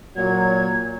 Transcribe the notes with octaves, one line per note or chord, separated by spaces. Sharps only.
A#2 F#3 G#6